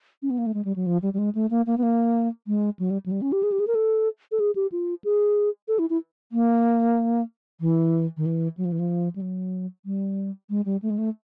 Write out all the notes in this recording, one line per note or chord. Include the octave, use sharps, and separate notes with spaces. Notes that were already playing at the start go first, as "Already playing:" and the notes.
C#4
B3
A#3
A3
G#3
G3
F#3
F3
G3
G3
G#3
A3
A#3
A#3
B3
A#3
G#3
F#3
G3
F#3
G3
C#4
G4
G#4
G4
G#4
A#4
A4
A4
G#4
G4
F4
G#4
A4
E4
E4
A#3
E3
D#3
E3
F#3
F3
E3
F3
G3
F#3
G3
G#3
G3
A3
G#3
A3